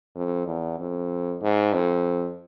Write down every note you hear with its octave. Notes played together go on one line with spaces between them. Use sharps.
F2
E2
F2
G#2
F2